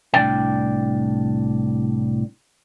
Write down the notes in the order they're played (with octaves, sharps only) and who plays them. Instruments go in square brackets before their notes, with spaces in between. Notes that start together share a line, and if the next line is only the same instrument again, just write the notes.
[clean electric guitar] C2 A2 E3 D4 D5 G5